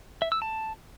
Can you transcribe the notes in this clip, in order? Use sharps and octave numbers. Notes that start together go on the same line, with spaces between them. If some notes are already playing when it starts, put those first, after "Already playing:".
E5
E6
A5